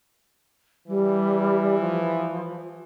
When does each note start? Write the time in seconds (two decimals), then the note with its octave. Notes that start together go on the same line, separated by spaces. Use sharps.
0.88 E3 G3
1.80 F3